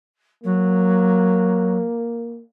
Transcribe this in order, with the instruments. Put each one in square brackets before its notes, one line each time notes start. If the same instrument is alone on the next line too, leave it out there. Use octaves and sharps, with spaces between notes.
[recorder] F#3 [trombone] A#3